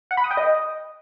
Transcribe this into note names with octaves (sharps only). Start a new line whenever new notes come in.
F#5
B5
D#6
G5
D#5